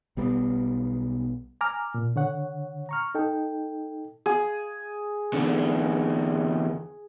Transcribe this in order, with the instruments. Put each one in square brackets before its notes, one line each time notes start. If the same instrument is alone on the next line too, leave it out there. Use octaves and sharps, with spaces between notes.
[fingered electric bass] B1 G3 B3
[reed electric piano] G#5 A#5 D6 F6
A#2
D3 C#5 F#5
A#5 C#6 F6
D#4 A4 G5
[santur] G#4
[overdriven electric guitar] E2 D3